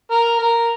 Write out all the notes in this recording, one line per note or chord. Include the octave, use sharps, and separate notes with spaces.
A#4
A#4